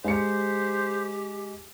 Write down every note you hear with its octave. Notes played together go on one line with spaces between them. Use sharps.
G#3 G4 C5 C#7